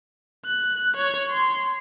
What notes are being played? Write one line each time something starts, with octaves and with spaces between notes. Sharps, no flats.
F#6
C#5
C6